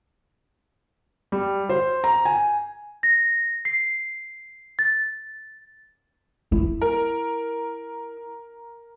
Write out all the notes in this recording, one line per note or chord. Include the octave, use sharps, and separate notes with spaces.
G3
C5
A#5
G#5
A#6
C7
A6
E4
A#4